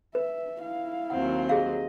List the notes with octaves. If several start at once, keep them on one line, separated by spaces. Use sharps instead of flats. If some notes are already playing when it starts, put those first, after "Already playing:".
B4 E5
E4 F5
D#2 F#3 C4 F#5
G4 G#4 D#5 F5